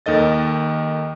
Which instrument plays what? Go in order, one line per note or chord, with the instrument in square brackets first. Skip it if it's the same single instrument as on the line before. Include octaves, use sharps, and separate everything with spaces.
[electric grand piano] D#2 D#3 A4 D#5 A6